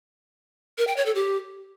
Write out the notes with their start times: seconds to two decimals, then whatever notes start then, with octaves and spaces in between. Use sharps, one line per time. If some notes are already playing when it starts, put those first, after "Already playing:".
0.78 A#4
0.87 G5
0.97 C#5
1.06 A4
1.15 G4